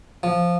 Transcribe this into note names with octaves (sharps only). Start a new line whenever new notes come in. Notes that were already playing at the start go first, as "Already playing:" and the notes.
F3